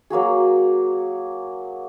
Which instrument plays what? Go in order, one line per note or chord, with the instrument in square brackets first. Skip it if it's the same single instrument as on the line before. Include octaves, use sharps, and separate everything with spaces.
[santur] F#3 A#3 F#4 G#4